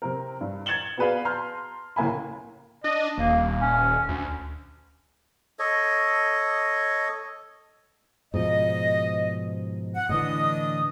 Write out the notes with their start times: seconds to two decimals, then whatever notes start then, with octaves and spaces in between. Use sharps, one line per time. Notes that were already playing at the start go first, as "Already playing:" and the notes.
0.02 C3 C4 A#4
0.41 G2
0.66 G#6 A6 C#7 E7 F#7 G7
0.97 B3 F#4 G#4 B4 D5 F5
1.25 A5 A#5 C6 F6 G6
1.96 C#2 A2 A#3 G#5 B5
2.84 D4 D#5
3.18 D#1 A#3
3.62 C#4
4.09 D2
5.59 A4 C#5 D#5
8.34 G#2 B2 F3 D#5
9.95 F#5
10.09 A2 D3 E3 D4 D#5 D#6